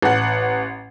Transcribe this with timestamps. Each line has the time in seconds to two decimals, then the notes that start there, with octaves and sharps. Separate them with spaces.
0.02 A1 F#5